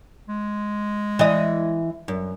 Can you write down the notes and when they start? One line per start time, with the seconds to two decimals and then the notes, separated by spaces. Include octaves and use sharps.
0.28 G#3
1.19 E3 D#5
2.08 F#2